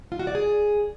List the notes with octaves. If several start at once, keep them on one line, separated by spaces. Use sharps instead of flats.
F4
F#4
D5
G#4